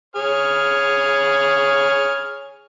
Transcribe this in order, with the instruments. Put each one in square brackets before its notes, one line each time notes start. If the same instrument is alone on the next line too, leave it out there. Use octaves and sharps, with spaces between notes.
[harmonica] G#4 C#5 F6